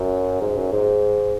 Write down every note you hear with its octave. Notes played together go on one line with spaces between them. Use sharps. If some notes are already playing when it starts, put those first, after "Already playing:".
Already playing: F#2
G#2
F#2
G#2